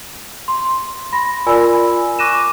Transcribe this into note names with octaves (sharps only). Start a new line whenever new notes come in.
C6
B5 C6 A#6
F4 A#4 D5 G#5 B5 E6
C#6 D6 F#6 A#6 D#7 E7